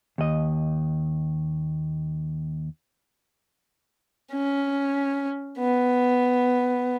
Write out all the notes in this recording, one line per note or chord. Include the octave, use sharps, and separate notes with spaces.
D#2 D#5
C#4
B3